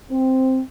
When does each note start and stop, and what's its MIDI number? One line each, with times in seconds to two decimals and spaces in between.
0.11 0.60 60